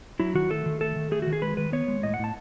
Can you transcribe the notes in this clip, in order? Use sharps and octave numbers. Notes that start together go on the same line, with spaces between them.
F#3 E4
D#3 F#4
A3 A4
D#3
A3 A4
D#3
A3 G#4
F#4
D#3
G#4
G#3 B4
D#3 B4
B3 C#5
G#3
A2 D#5
F#5
A2 A5